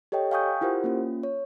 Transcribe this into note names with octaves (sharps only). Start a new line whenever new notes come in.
G4 A4 C#5 D#5 G5
F5 G5 G#5 C#6 D#6 G6
E4 F4 G4 A#4 C5 F#5
A#3 C#4 F4
C#5